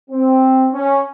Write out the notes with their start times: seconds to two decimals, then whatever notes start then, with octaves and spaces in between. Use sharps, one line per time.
0.10 C4
0.71 C#4